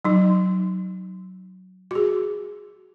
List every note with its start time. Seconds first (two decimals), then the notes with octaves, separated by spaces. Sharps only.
0.04 F#3 D#4
1.91 F#4 G#4